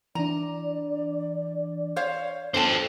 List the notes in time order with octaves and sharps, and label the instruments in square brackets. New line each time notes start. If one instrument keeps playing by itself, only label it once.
[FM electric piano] E3 D4 [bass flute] D5 [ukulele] A#5
[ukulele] C5 C#5 F5
[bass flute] B3 [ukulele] D4 A5 [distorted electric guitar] A4 C5